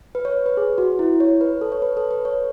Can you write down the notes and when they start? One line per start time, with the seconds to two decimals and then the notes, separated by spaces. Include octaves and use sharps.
0.15 B4
0.25 C#5
0.46 B4
0.57 G#4
0.78 F#4
0.99 E4
1.20 C#5
1.41 B4
1.61 A4
1.72 C#5
1.82 B4
1.97 A4
2.11 B4
2.25 C#5